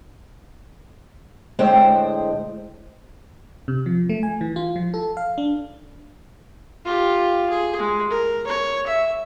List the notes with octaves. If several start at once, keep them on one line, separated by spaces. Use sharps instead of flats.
A2 D3 G#3 C4 C5 G5
C3
F3
A3
G#5
E3
F4
F3
A4
F5
D4
F4 G4
G#4
G#3
A#4
C#5
E5